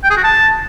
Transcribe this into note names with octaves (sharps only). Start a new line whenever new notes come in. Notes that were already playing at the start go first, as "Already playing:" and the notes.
G5
G#4
F#4
A5